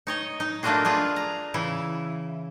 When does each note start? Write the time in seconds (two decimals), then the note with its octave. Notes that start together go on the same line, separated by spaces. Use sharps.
0.07 D#4 C#5 D#5
0.40 D#4
0.63 A3 A#3 D4 F4 F#4 G#4
0.85 D4 F4 G#4 B4
1.16 A#5
1.54 C#3 E3 E4